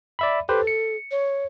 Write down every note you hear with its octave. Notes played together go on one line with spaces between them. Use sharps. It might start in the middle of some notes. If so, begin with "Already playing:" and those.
D5 E5 B5
G4 A4 B4 C5
C#7
C#5